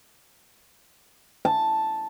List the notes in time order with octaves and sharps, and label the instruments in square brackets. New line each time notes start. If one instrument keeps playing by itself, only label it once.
[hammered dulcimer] A5